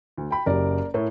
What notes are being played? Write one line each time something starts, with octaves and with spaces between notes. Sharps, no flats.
D2
G5 B5
F#1 F#3 G4 A#4 D5
A2 A#4 C#5 E5